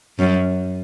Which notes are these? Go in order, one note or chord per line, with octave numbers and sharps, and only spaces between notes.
F#2